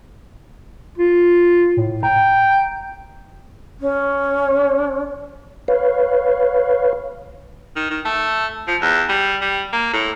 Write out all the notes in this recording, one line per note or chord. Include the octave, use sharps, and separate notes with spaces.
F4
A2
G5 A#5
C#4
B4 C#5 F5
D#3
D#3
A3
F3
E2
G3
G3
A#3
A2